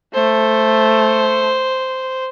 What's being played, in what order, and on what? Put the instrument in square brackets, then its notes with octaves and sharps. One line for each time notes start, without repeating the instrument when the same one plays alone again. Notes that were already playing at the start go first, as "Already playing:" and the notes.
[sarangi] A3 [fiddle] C5